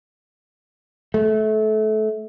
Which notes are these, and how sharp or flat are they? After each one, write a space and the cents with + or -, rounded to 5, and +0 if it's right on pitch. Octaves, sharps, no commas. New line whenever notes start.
A3 -25